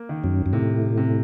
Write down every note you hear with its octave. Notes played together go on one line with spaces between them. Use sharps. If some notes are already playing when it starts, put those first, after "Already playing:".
Already playing: A#3
D#3
F#2
F#2
A2 C3
C3